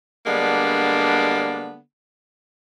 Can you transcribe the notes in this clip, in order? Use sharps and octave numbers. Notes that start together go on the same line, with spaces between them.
D3 G3 G#3 A#3 B3 D4